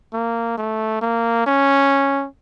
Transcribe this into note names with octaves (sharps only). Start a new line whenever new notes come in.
A#3
A3
A#3
C#4